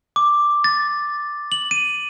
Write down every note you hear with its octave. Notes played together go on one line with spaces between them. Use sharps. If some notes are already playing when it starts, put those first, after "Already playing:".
D6
A6
F#7
D#7